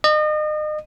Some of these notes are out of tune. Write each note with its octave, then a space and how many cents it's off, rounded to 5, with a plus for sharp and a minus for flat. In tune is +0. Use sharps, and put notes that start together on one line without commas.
D#5 -35